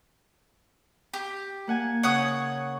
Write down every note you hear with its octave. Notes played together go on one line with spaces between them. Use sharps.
G4
A#3 F#5 G#5
C#3 C#5 F#5 D#6
C#6